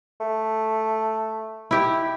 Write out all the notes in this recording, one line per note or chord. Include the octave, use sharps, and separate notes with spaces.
A3
E4 G4